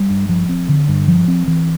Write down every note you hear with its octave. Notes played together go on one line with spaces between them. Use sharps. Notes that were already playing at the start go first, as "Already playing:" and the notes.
Already playing: G3
G2
F3
C4
D3
G2
F3
C4
E3